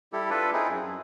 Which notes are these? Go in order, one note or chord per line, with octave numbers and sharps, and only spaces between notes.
G3 E4 G4 A4
D4 F4 A4 B4
C4 D#4 E4 G#4
F#2
F#2